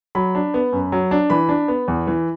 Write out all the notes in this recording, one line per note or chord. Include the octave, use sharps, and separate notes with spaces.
F#3 B5
D4
B3
F#2
F#3
D4
E3 B5
D4
B3
E2
E3